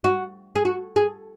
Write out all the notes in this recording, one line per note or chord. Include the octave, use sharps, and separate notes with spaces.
F#4
G#4
F#4
G#4